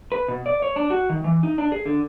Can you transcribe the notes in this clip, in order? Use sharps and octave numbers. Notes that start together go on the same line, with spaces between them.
B4
B2
D5
C#5
D4
F#4
D#3
E3
D#4
D4
G#4
D3